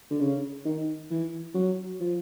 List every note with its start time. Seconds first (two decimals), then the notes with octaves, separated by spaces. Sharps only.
0.10 D3
0.20 C#3
0.65 D#3
1.11 E3
1.55 F#3
2.00 F3